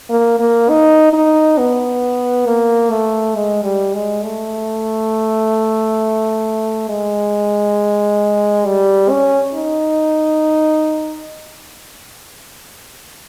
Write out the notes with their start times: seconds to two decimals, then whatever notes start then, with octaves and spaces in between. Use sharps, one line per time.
0.10 A#3
0.39 A#3
0.69 D#4
1.13 D#4
1.58 B3
2.46 A#3
2.91 A3
3.35 G#3
3.64 G3
3.94 G#3
4.24 A3
6.89 G#3
8.66 G3
9.10 C#4
9.55 D#4